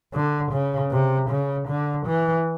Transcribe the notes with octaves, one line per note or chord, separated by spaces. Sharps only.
D3
C#3
C3
C#3
D3
E3